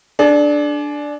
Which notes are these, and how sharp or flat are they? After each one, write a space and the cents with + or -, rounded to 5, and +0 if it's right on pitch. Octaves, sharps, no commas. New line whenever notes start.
D4 +0 G#4 +40